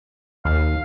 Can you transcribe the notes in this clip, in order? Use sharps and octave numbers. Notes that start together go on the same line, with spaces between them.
D#2 F5